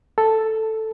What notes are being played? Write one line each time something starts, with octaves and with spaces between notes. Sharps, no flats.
A4